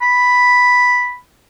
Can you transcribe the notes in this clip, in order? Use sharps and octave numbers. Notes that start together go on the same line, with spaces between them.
B5